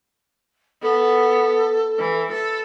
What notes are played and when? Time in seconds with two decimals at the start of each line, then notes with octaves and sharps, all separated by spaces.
0.82 B3 A4
1.99 E3
2.32 A4